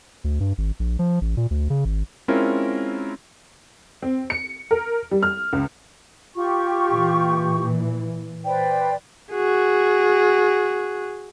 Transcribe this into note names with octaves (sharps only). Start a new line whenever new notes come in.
D2
G2
G#1
A#1
F3
A1
A#2
D2
C#3
G#1
G#3 C4 C#4 E4 F4 A#4
C4
C#7
A#4
G3
F6
C#2
F4 G4 C#6
A#2 E3
B4 C5 D5 G5
F#4 G#4